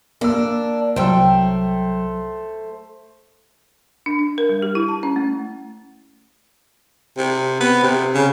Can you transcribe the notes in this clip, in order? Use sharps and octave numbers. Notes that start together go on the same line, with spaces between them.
A#3 D4 E6
C2 F#3 A3 C5 G5 E6
D4
D4
A#4
G3
G4
E4
A5
C#4
A3
C3
B3
C3
C#3